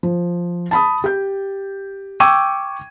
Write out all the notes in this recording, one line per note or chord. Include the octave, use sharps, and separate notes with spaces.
F3
A5 B5 D#6
G4 G6
G5 C#6 D6 E6 G#6 D#7